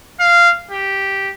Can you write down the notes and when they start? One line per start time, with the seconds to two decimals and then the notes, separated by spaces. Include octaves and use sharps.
0.20 F5
0.71 G4